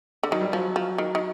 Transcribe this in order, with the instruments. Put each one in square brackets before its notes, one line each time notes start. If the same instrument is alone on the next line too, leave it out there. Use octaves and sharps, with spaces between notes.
[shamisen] D3
[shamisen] D#3 [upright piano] F#3
[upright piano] G3
[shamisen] F3 [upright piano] F#3
[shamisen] F3
D#3
D#3